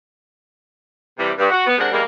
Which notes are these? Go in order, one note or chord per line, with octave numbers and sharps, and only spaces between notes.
C3 E3 G3
G2
F#4
B3
C3 G#3 C4 D4 A#4 F#5
E2 G3 G#3 A#3